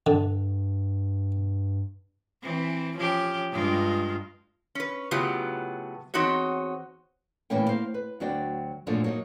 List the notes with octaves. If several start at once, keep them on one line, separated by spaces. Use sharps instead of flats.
G2 D3
E3 C4
F3 C#4 G4
G2 G#3 F4
C#4 B4
A2 C#3 F#3 B3 F4 G4
E2 C4 D#4 F#4 C#5
D2 A2 E3 A#3 C#4 G5
A#3 C5 F5
B4
D2 F#3 D4 F#4 D5 G5
F#2 A#2 F3 F#3 A3 D4
F#3 A#3 D#4